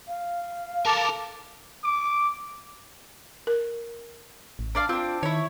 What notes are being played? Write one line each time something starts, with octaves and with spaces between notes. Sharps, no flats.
F5
A4 A#4 A5 D6
D6
A#4
A1
D4 D5 F5
C4 D4 F4
D#3 E4 C#5